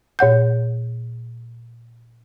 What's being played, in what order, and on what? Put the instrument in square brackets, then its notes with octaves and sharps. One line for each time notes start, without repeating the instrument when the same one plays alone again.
[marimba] A#2 C#5 F#5 G6